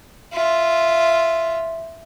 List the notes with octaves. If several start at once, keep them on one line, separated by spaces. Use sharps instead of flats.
F4 E5